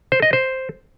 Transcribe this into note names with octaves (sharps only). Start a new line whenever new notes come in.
C5
D#5
C5